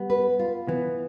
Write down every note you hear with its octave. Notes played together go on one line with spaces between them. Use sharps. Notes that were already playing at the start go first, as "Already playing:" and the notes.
Already playing: G3 B3
B4
F4
E3 B3